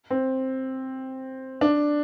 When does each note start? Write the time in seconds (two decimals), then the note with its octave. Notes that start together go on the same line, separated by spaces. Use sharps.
0.11 C4
1.61 D4